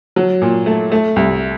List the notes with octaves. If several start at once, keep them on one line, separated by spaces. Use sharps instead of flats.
F#3
A#2
A3
A3
C2